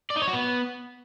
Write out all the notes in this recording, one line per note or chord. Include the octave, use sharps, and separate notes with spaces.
D5
D#4
C#5
F#4
B3